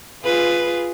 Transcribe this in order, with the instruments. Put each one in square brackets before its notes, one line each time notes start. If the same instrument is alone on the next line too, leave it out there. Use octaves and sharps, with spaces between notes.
[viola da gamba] F4 G#4 B4